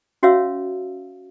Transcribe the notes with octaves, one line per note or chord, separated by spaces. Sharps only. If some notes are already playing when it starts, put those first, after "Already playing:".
C#4 F#4 C#5 E5 F5 E6